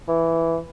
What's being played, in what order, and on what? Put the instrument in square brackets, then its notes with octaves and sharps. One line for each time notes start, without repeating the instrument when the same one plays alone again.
[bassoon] E3